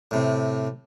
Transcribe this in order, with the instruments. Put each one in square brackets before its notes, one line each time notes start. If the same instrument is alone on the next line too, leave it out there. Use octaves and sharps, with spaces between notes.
[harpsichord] A2 C3